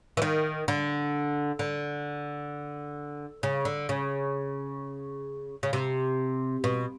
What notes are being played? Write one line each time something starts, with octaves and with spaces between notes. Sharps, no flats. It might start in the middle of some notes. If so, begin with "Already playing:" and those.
E3
D#3
D3
D3
C#3
D3
C#3
C#3
C3
B2